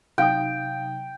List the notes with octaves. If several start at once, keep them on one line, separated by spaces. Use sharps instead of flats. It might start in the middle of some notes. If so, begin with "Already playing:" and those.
C3 F#3 D#4 F5 G5 D#6